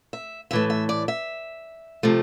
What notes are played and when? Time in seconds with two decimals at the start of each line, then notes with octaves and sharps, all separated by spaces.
0.13 E5
0.51 A2 E3 A3 E5
0.70 E5
0.89 D5
1.08 E5
2.03 C3 F3 A3